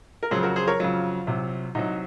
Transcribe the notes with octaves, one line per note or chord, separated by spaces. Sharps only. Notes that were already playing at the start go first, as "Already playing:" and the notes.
A#4
F2 C#3 F#3 G#4 C5
F#4 A#4
G#4 C5
A#4 C#5
F2 C#3 F#3 F4
C2 C3 F#3
C2 C3 F#3 D#4